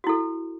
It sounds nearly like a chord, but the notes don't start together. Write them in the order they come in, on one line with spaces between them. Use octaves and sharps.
F#4 E4 A4